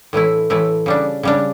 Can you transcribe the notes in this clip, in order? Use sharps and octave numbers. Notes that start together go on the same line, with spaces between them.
A2 E3 A3 E4
A2 E3 A3 E4
C#3 G3 D4
C#3 G3 D4